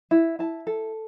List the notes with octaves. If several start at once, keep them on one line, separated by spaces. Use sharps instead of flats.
E4
E4 A5
A4